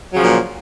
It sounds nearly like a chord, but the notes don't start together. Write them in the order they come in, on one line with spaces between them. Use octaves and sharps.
F#3 C#3 F3 A#2